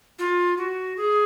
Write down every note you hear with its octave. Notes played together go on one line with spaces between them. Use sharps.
F4
F#4
G#4